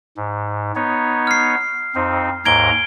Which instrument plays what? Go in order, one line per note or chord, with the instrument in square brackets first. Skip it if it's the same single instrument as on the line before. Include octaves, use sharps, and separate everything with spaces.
[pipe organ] G#2
B3 D#4 C#5
[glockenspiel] F6 C7
[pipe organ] F2 C4 D#4
[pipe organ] D#2 G#2 A#5 [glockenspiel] G#6 D7 G7